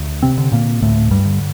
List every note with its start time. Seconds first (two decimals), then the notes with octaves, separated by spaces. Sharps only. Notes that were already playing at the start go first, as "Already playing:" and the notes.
Already playing: D2
0.23 C3 C4
0.38 D3
0.52 A#2 A#3
0.82 D2 A2 A3
1.11 G2 G3
1.26 D3